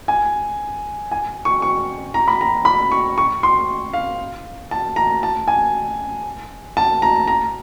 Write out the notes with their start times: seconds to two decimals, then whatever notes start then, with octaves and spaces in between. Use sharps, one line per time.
0.08 G#5
1.11 G#5
1.45 C#6
1.62 C#6
2.14 A#5
2.28 B5
2.41 A#5
2.65 B5
2.92 C#6
3.18 C#6
3.43 C6
3.93 F5
4.71 A5
4.96 A#5
5.23 A5
5.48 G#5
6.77 A5
7.02 A#5
7.28 A#5